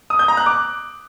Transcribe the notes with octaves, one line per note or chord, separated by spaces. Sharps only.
D#6
G6
A#5
F#6
D6